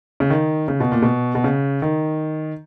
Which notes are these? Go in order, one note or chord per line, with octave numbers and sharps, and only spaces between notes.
C#3
D#3
C#3
B2
A#2
B2
B2
C#3
D#3